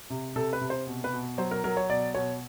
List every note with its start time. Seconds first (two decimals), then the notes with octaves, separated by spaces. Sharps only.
0.10 C3
0.36 C3 A4
0.53 B4
0.61 C3
0.70 C5
0.87 B2
1.04 B4
1.13 B2
1.38 F#3 C5
1.51 A#4
1.64 F#3 A#4
1.77 C#5
1.89 B2 D5
2.15 B2 C#5